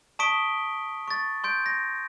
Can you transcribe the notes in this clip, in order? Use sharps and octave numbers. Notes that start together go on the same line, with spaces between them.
A5 C#6 D#6 B6 D7 G7
C#6 A6
C6 G6 D7
A#6